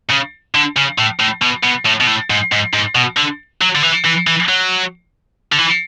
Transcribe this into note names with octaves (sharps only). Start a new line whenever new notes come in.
C#3
D3
C#3
A2
A2
B2
B2
A2
B2
A2
G#2
G#2
G#2
B2
D3
F#3
D3
E3
E3
E3
F#3
D3
E3